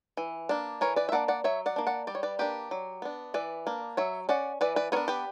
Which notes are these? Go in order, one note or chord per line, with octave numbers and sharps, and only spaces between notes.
E3
A#3 D4
E3 A#4 C#5
B4 D5
E5
A#3 D4 D5 F#5
D5 F#5
F#3 C#5 E5
D5 F#5
A#3 D4
D5 F#5
G3 D5
C#5
B4 D5
A#3 D4 G4 B4
F#3
B3 D4
E3 B4 D5
A#3 D4
F#3 C#5 E5
C#4 D5 F#5
E3 B4 D5
B4 D5
B3 D4 A#4 C#5
G4 B4